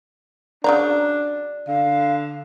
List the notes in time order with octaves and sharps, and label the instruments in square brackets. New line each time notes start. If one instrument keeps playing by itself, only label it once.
[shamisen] C#3 F#3 A#5 [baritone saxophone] D4 [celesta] D5
[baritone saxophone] D3 [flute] F5